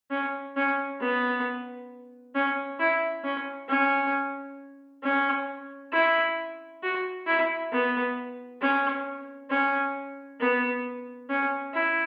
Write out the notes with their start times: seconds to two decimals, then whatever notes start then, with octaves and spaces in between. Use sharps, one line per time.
0.11 C#4
0.56 C#4
1.01 B3
2.35 C#4
2.80 E4
3.24 C#4
3.69 C#4
5.04 C#4
5.93 E4
6.83 F#4
7.27 E4
7.72 B3
8.62 C#4
9.50 C#4
10.41 B3
11.30 C#4
11.74 E4